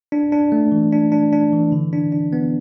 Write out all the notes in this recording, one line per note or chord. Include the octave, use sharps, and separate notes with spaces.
D4
D4
A3
E3
D4
D4
D4
E3
D3
D4
D4
B3